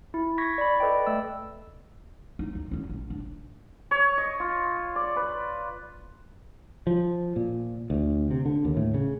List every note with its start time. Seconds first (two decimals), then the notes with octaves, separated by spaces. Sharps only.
0.14 E4
0.38 C#6 G#6 A#6 B6
0.58 D5 B5
0.80 A4 B4 D5 D#5 G5
1.06 A3 E6
2.39 A#3 D#4
2.55 D#2
2.71 E2 C#4
2.89 A#1
3.10 D4
3.91 C#5
4.18 D#5
4.40 F4
4.96 D5
5.16 B4
6.87 F3
7.36 A#2
7.90 D2
8.31 C3
8.46 D3
8.65 D#2
8.77 A2
8.94 C#3